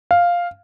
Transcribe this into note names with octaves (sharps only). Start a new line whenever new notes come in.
F5